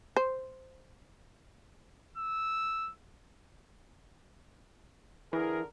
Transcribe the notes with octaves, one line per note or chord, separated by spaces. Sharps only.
C5
E6
D3 E3 G#4 A#4